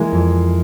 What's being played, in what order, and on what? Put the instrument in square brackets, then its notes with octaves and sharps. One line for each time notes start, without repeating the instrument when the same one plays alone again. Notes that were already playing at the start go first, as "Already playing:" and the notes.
Already playing: [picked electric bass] E3 [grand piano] G#3 A#3
[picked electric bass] F2